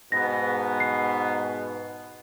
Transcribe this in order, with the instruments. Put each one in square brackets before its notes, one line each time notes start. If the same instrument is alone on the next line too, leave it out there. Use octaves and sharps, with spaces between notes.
[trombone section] G#2 B2 B3 [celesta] A#6
[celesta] C7